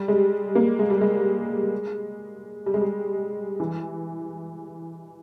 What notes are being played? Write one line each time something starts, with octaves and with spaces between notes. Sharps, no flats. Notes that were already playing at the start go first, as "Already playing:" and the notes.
Already playing: G3
G#3
A#3
G#3
G3
G#3
G3
G#3
G3
E3